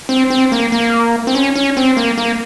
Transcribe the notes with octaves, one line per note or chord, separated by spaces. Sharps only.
C4
C4
A#3
A#3
C4
C#4
C#4
C4
A#3
A#3